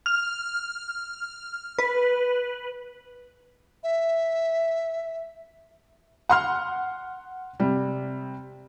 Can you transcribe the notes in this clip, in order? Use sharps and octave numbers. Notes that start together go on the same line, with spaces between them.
F6
B4
E5
F#5 C6 F6
C3 G3